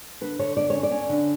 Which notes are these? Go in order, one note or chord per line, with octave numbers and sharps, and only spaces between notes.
D3 B4
D3 C#5
D3 D5
C#4 C#5
D5
C#4
D3